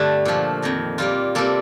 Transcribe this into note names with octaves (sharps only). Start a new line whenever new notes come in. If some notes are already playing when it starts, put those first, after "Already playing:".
Already playing: G2 D3 A3 D4
A#2 F3 A3
F2 D#3 A#3
A#2 G3 A#3 F4
C3 G3 A#3 A4